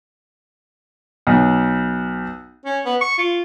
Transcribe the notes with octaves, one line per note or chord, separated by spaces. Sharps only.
B1
C#4
B3
C#6
F4